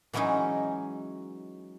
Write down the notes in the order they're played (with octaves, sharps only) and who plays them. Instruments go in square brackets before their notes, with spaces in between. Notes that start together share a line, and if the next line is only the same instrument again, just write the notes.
[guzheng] E3 F#3 G#3 C#4 D#4